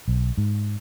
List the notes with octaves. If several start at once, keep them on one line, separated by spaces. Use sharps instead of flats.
B1
G#2